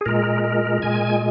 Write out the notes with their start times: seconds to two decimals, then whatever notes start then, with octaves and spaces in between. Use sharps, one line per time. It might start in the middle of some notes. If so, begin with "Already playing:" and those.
0.01 G#4
0.06 A#2 G#3 A#4
0.44 A#4
0.82 A#2 G#3 G#5